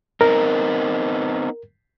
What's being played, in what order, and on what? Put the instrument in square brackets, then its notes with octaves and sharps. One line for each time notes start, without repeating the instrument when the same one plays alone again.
[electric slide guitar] B3 C4 D#4 [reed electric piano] A#4